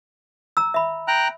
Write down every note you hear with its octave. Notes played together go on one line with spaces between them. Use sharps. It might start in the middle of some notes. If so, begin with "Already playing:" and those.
A#5 E6
E5 B5
G5 A#5 F#6